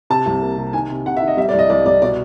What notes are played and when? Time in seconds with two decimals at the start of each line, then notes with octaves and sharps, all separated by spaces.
0.10 C3 A5
0.26 C2
0.42 A#3
0.57 C3
0.73 D#3 G#5
0.90 C3
1.06 C3 F#5
1.17 E5
1.22 D#3
1.28 D#5
1.37 G3 E5
1.49 D5
1.53 C2
1.59 D#5
1.70 C2 D5
1.86 C2 D5
2.02 B2 D5